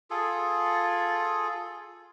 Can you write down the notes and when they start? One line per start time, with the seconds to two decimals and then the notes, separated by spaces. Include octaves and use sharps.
0.11 F4 G#4 A4